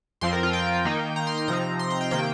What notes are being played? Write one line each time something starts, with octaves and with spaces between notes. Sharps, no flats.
F2 F3 C4 C6
A#4
F4
G5
D#3 A#3 D#4
A#5
C6
C6
C3 F3 C4 D#4 A#5
C6
A#5
G5
C3 D#3 A#3 G5